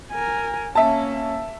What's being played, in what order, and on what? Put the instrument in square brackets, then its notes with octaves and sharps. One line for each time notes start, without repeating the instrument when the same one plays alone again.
[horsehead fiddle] A#4 G#5
[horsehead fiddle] A#3 C#4 [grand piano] E5 A5